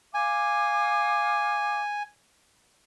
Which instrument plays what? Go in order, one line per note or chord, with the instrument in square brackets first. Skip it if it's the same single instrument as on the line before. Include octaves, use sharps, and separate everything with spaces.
[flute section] F5 D6 D#6 [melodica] G#5